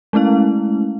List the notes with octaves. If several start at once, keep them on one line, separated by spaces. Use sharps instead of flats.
G#3 A3 C#4 E4 F5